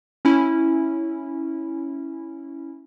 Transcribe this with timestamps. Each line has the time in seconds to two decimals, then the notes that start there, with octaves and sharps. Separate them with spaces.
0.25 C#4 E4